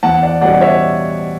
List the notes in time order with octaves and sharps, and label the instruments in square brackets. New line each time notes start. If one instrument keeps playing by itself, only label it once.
[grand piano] E2 F#5 A5
D5 F#5
B2 G3 C#4 D5 F#5
C#5 E5